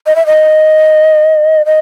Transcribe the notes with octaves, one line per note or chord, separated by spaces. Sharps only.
D#5
E5
D#5
D#5